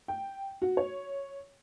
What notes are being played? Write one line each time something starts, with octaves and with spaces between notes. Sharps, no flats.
G5
F#4
C#5